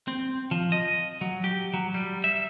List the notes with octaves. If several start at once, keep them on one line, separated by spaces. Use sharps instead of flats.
C4
F3
D#5
F#3
G4
F#3
G3
E5